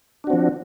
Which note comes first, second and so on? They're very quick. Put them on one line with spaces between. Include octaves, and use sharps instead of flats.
D4 F#4 C4 F3